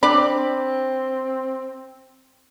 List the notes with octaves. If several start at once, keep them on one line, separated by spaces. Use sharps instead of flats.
C4 D4 D5 B5